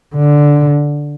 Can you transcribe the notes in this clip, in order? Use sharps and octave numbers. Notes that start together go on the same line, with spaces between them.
D3